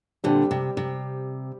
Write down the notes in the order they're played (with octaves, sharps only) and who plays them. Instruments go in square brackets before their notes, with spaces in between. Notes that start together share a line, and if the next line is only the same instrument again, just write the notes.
[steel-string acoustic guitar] A#2 D3 [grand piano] G3 C4 G4
[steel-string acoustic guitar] C3
C3